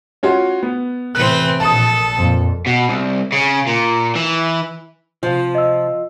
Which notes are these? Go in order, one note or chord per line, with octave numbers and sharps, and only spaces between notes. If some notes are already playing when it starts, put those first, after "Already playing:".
C#4 F4 F#4
B3
A2 C3 E3 C4 B4 F#6
A#1 A#2 A4 A5 D#6
F2 A#2 F3
B2
C2
C#3
A#2
E3
C3 F3 F4 C5 F5
D#5 E6